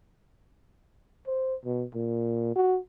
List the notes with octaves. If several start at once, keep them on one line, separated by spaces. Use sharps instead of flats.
C5
B2
A#2
F#4